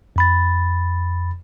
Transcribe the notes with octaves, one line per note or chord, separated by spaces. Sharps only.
F2 B5 A6